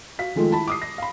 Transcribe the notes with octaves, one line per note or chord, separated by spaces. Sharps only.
F#4 F5 B6
D#3 F3 G#3 A3 F4 A4
E4 A5 B5
D6 D#6 C7
A#6
F5 B5